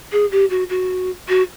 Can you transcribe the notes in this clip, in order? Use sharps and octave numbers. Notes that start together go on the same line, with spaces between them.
G#4
G4
F#4
F#4
F#4